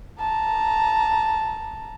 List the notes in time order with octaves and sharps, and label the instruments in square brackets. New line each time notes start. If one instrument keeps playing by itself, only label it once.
[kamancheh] A5 A#5